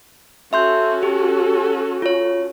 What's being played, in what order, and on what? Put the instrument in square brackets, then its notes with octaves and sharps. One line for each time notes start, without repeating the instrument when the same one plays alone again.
[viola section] C#4 F#4 A4 [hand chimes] E5 C6 G6
[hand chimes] G4
F4 C#5